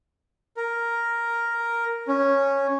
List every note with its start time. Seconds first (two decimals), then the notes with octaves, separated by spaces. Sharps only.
0.57 A#4
2.08 C#4